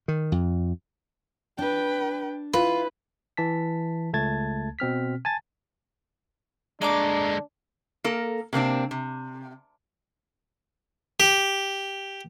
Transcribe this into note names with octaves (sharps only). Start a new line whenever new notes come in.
D#3
F2
D4 B4 G5
E4 F4 B4
E3 A5 B6
C#2 A3 A5 G#6 A6
B2 C4 F6 B6
G#5 A5 A6
D3 G#3 A#3 D4 C#6 D6
A#3 A4 A#4
C3 A#3 C4 D4
C3
G4